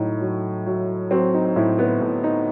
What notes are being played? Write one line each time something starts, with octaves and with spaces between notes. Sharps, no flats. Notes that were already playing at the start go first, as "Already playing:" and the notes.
Already playing: A2 F#3 D#4 E4
F#3
F#3
F#3 C4
D#4
A2 E4
B3
A2
D#4